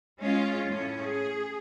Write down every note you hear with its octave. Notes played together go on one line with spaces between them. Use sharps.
G#3 C#4 F4
A2 C#4
G#4